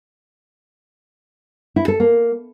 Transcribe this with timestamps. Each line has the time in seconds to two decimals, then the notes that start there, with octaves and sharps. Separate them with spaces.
1.76 E4
1.88 A4
2.00 A#3